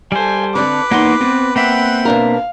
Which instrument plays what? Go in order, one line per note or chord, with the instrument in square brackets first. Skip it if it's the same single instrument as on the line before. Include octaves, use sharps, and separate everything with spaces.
[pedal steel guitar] G3 C5 [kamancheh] A4 G#5
[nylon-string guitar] D3 C4 D4 [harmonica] B4 [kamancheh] D6
[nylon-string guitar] E2 D#4 F#5 [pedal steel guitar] A#3 C6
[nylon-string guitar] B3 [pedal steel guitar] C4
[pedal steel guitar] A#3 C4 E5 [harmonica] B4 F#5 G5
[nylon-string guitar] B2 D4 A#4 [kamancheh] F5